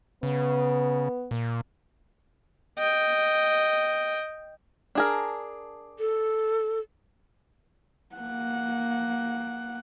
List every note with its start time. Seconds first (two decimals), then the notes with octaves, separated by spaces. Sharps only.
0.23 C#3 B3
1.31 A#2
2.78 D#5 G5
4.95 D4 G#4 A#4
5.99 A4
8.16 A#3 F#5